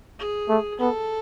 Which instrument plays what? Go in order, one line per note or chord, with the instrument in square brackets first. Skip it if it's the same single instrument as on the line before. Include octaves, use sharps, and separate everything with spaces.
[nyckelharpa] G#4
[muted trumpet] A3
[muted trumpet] B3 [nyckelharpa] A4